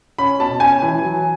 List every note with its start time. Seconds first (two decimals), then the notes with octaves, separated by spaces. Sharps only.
0.18 C#4 B5
0.40 B2 A5
0.60 C#4 G#5
0.82 E3
1.02 F#3